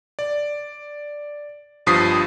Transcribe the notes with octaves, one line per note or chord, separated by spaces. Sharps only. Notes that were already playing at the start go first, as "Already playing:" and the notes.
D5
G1 G2 F3 D#6 B6 C7